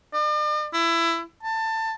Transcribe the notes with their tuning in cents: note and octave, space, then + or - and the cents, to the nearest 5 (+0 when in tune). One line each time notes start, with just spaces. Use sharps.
D5 +45
E4 +20
A5 +20